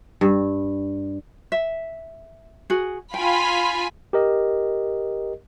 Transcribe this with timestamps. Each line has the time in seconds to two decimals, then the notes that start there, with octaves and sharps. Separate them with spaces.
0.21 G2
1.52 E5
2.70 F#4 G#4
3.14 F4 G5 G#5 B5
4.13 G4 A#4 D#5